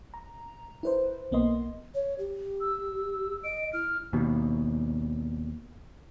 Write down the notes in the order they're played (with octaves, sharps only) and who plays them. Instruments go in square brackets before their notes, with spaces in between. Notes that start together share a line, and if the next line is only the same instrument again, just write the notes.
[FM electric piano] A#5
E4 B4 C5
B1 A#3 B3 D#5 C6
[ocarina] C#5
G4
[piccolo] E6
[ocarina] D#5 [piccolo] D7
[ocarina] E4 [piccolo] F6
[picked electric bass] D#2 B2